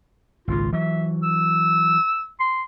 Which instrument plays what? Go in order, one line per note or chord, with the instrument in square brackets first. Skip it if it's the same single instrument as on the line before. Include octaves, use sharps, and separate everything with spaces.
[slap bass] G#1 C#2 A#2 [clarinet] F4
[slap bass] E3 F#3 [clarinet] E5
[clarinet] E6
C6